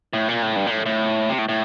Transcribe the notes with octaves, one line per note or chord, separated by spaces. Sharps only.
A2
A#2
A2
G2
A#2
A2
A2
C3
A2
A2